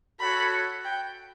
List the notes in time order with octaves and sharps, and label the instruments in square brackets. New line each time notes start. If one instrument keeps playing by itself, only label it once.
[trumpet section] F#4 A4 C#5 F#5 [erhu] B5
[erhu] G5